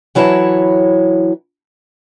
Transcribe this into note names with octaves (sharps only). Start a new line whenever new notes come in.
E3 F#3 E4 C#5 E5 A5